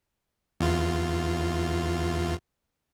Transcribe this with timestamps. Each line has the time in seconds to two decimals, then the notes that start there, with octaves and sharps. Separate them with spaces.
0.60 E2 F4